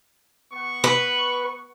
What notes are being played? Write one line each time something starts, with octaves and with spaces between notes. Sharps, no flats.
B3 F#5 C#6
B4